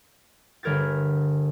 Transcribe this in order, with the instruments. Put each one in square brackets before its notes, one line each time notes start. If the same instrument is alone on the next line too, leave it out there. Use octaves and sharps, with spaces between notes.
[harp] G1 D3 A#4 G#6 A6